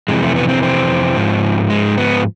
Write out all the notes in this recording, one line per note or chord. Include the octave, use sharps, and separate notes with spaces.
F2 C3 E3 G#3
A3
B3
C4
C4
G#2 F3
G#3
B3